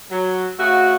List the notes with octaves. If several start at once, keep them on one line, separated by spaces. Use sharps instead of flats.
F#3
C#3 A3 F#4